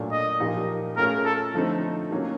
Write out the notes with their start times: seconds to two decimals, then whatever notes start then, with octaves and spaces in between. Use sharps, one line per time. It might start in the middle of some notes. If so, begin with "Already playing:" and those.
Already playing: A#2 F#3 A3 D4
0.12 D#5
0.40 A#2 F3 A#3 D#4 G4
0.97 A3 C#4 F4 G#4 A#4
1.25 A4
1.54 D3 F3 A3 C4 D#4
2.11 D#3 F#3 A#3 C#4